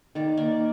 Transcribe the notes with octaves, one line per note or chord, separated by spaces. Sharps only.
D#3 D5
A#3 D5